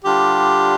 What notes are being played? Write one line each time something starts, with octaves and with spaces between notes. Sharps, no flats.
D3 G3 D4 F4 G4